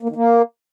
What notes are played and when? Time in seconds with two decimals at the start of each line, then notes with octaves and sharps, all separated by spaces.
0.03 A#3
0.09 D#3
0.16 A#3